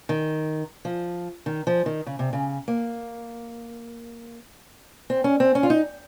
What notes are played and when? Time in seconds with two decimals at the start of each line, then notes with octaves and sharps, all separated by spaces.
0.09 D#3
0.85 F3
1.46 D#3
1.67 F3
1.86 D#3
2.06 C#3
2.19 C3
2.33 C#3
2.68 A#3
5.10 C4
5.24 C#4
5.40 C4
5.55 C#4
5.63 F4
5.70 D#4